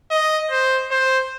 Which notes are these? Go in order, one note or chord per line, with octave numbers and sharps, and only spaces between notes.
D#5
C5
C5